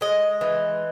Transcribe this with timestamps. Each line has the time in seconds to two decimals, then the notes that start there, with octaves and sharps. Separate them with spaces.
0.01 G#3 D#5
0.41 E3